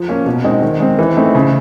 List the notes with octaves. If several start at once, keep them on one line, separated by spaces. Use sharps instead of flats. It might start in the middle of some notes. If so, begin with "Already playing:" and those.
Already playing: F3
A#3 C#4 F4
B2
G#3 C4 D#4
D#3
G#3 C4
E3
A3 C4 D#4
C#3